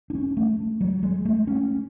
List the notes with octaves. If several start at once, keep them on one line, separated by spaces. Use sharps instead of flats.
D4
C#4
A3
F#3
G#3
A3
C#4